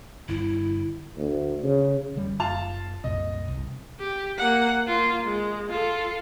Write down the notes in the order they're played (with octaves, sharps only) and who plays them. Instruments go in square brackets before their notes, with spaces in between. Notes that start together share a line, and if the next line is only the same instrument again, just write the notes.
[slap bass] G1 [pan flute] E4
[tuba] D2
C#3
[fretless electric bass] F1 D3 G3
[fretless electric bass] F#1 [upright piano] F4 A5 F7
[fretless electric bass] C2 F#2 A#2 [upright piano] D#5
[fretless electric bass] C2
[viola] G4
A#3 F#5
A#3 F4
G#3
F4 A4